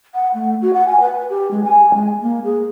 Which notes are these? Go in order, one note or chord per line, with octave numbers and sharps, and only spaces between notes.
F#5
A3
F#4
F#5
G#5
B4
G4
G#3
G#5
G#3
A#3
G#4